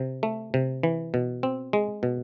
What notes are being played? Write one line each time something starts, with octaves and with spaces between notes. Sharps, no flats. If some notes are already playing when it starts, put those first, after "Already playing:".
Already playing: C3
A3
C3
E3
B2
C4
G#3
B2